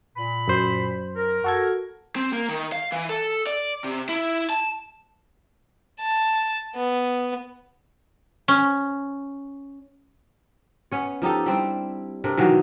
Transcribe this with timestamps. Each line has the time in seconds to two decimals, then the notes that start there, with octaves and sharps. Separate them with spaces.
0.17 A#2 B5
0.48 F#2 C5
1.16 A#4
1.44 F#4 A4 G#6
2.16 C4
2.33 A#3
2.49 D#3
2.72 F5
2.92 E3
3.09 A4
3.47 D5
3.84 C3
4.09 E4
4.50 A5
6.01 A5
6.76 B3
8.48 C#4
10.92 B3 C#4 C#5
11.22 F3 D#4 G4 A4
11.46 G3 C4 D4 E4
12.24 C3 D4 A4 A#4
12.37 B2 D#3 E3 F#3